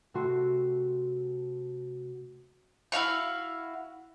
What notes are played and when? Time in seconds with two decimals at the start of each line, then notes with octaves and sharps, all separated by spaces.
0.14 C3 A3 C4 F#4 C6 C#7
2.92 E4 F#4 F5 C#6